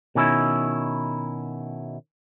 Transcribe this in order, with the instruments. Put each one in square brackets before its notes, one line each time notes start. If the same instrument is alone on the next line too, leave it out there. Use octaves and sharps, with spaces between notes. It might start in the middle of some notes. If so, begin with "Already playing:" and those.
[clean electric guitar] B2 D#3 C#4 E4